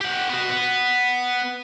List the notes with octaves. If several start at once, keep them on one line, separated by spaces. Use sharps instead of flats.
G4 F#5
B3 F#4
B3